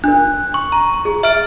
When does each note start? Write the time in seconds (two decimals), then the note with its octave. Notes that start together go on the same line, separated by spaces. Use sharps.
0.04 D4 A#4 F#6
0.54 C#6
0.72 A#5
1.05 G#4
1.23 E5 F6 D7